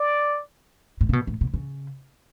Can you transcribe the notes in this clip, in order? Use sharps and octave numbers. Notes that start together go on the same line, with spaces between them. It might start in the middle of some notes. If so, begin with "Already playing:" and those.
Already playing: D5
A2
C#3
B2
A2
B2
C#3